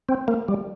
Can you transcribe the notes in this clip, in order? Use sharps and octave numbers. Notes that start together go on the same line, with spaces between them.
C4
A#3
G3